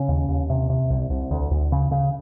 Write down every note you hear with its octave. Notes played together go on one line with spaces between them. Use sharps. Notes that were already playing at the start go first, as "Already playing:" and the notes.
Already playing: C#3 C#4
D#2
D#2
C3
C3
C2
C2
D2
D2
C#3
C#3